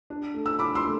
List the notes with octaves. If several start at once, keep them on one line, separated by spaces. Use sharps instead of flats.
D4
A3
E6
D4 B5 D6
C6 E6
A3